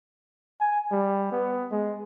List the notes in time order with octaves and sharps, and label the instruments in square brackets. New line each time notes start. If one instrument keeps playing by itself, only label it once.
[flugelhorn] G#5
G3
B3
G#3